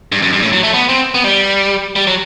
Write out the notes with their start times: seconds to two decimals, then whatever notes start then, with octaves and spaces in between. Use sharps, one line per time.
0.12 G2
0.22 F#2
0.33 G2
0.43 A2
0.53 F#3
0.63 A3
0.74 B3
0.89 C4
1.14 B3
1.24 G3
1.96 G3
2.07 F#3